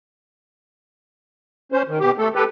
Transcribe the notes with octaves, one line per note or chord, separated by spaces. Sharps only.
C#4 C5
D#3
B2 G4
A3 A4
G4 A4 B4